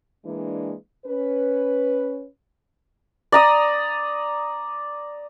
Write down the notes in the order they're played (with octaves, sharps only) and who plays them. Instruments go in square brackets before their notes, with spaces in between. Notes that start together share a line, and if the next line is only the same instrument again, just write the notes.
[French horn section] E3 G#3 A#3 D4
C#4 B4
[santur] D5 A#5 D#6